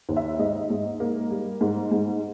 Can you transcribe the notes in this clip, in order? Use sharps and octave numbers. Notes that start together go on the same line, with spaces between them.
D#2
E5
G#2 D#5
G#2
A#3
G3
G#2
G#2